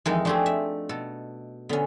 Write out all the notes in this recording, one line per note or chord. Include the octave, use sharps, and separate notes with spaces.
F2 D#3 E3 G#3 D#4
F3 A3 C4 D4 G4 G#4
E5
B2 A4
D3 B3 C#4